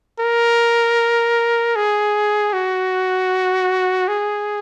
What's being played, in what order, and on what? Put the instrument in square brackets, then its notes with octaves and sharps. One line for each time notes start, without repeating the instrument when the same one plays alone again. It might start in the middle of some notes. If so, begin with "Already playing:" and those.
[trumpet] A#4
G#4
F#4
G#4